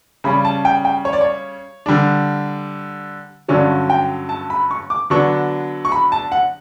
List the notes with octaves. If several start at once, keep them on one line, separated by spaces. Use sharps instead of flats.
C#3 G3 C#4 B5
A5
G5
G5
C#5
D5
C#5
D3 G3 D4
G2 D3 F#3 C#4 D5
G5
A5
B5
C#6
D6
D3 F#3 B3 D4 C#6
C#6
B5
A5
F#5